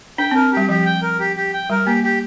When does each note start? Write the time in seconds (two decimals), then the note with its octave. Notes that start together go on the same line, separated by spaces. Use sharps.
0.18 D4 G5
0.31 C4 A#4
0.53 G3 G4
0.69 F3 G4
0.86 G5
1.02 A#4
1.20 G4
1.36 G4
1.54 G5
1.70 G3 A#4
1.86 A#3 G4
2.04 G4